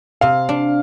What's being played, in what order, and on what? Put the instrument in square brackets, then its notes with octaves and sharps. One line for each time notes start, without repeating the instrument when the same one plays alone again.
[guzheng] C3 [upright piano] F5
[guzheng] D4